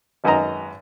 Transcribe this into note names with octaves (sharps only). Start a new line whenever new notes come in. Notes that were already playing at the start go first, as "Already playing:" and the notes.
G#1 F#2 B4 D#5 A#5